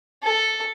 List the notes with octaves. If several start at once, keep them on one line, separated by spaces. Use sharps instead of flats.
A4